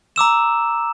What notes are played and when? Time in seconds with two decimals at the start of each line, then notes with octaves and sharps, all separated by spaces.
0.16 A#5 D6 E6 E7